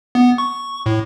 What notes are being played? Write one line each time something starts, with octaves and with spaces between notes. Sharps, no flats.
B3
C#6
A2